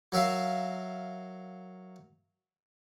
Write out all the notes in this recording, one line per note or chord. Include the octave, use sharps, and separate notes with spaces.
F#3 A#4 E5 F5